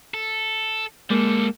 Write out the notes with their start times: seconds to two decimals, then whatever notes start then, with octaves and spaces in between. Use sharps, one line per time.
0.14 A4
1.10 G3 G#3 A#3 A4